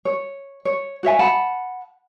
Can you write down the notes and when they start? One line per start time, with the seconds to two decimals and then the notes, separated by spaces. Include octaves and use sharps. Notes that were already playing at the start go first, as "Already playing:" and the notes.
0.05 C#5
0.65 C#5
1.03 F#4 C#5 E5 G#5
1.19 F#5 A5 B5